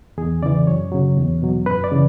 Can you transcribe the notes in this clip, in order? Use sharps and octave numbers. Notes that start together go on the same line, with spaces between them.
E2 G#4
C#3 E3 D5
F#2 C#5
C#3 F#3
E2
B2 F#3
F#2 B4
D5
C#3 E3